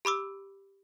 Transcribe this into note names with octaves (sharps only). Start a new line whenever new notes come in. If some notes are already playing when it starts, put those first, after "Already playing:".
G4 B5 D6 E6